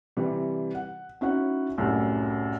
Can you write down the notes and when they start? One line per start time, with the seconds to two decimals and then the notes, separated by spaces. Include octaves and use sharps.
0.17 C3 E3 G3
0.75 F#5
1.21 C#4 D#4 E4 F#4 C#5 F#5
1.78 C2 F#2 A2